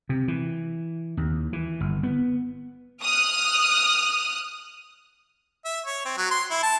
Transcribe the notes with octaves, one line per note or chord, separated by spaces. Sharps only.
C3
E3
D#2
E3
G1
B3
D#6 F6 F#6
E5
C#5
C4
F#3
C6
E4
A5